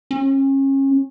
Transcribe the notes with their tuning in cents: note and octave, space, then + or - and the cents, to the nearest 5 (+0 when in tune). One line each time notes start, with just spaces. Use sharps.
C#4 -30